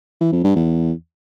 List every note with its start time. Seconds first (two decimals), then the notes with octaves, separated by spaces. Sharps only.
0.21 E3
0.33 F2
0.44 G2
0.56 E2